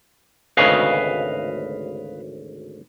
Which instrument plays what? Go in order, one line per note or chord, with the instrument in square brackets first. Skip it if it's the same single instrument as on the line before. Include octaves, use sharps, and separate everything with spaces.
[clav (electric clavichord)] G#1 D2 C#3 [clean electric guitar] B4 D#5 F5